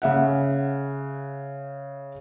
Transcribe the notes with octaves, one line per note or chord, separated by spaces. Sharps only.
C#3 E5 F#5